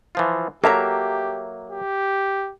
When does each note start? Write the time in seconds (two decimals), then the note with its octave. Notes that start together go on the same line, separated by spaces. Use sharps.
0.15 E3 F3 F4
0.64 F#3 A#3 G4 A4 E5 A#5
1.70 G4